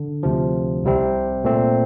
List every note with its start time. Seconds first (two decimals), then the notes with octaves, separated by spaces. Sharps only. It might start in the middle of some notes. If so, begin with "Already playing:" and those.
Already playing: D3
0.23 D2 C3 F3
0.84 C2 C3 G3 C4
1.44 A#2 A3 C4